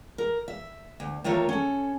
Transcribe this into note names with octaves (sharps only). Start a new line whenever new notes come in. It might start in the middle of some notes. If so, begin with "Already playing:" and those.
A#4
E5
D2
D#3 A3 A#3 F4 C#5
C#4 A4